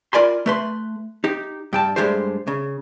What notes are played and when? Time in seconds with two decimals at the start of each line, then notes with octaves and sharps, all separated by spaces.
0.13 F4 A#4 D5 G#5 B5 C6
0.46 A3 B4 C6
1.24 D#4 G4
1.73 G2 G5 A5
1.96 G2 B2 G#3 A3 G4 C5
2.47 C#3